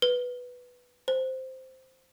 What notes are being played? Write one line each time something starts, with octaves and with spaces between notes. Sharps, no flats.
B4
C5